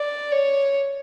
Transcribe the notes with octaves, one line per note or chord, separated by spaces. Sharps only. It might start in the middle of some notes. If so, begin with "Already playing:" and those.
Already playing: D5
C#5